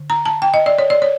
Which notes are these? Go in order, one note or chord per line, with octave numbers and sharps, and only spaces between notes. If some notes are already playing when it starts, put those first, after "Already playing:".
Already playing: D3
A#5
A5
G5
D#5
D5
C#5
D5
C#5